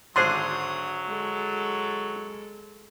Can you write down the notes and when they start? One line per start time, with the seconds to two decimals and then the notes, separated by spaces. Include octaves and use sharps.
0.16 G#1 D3 F#3 D4 G#4 C5 C6 D#6
1.06 G#3 A4